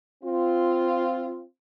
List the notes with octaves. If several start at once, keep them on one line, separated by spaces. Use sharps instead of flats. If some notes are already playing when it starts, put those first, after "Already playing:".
C4 F4